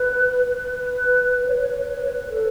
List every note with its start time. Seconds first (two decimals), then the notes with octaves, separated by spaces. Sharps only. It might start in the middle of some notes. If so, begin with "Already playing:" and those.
Already playing: B4
0.51 B4
1.40 B4
1.48 C#5
1.54 B4
1.61 C#5
1.68 B4
1.76 C#5
1.84 B4
1.90 C#5
1.97 B4
2.04 C#5
2.12 B4
2.29 A4